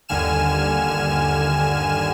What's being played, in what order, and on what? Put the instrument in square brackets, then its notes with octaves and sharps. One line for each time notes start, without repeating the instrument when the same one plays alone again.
[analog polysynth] G1 D#2 D3 G#5 F6 E7